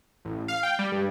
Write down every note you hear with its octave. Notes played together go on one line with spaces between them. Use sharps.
A1
F5
G5
G3
G2